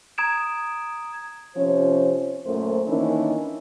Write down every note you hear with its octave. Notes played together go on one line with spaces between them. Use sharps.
A#5 D#6 G#6 D7 E7
C3 F3 C#4 C#5
F#2 A#2 A3 A#4 C5
D#3 E3 A#3 C#4 D4 E4